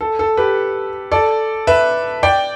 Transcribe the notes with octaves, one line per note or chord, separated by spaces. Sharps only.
A4
A4
G4 B4
A4 D5
B4 E5
D5 G5